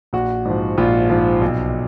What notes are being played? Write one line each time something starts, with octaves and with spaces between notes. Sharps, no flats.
A#1 F#4
G#2 F3
A#1 F4
G#2 F3
B1